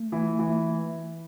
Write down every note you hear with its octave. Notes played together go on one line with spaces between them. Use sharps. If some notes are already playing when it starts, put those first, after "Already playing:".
Already playing: A3
E3
E3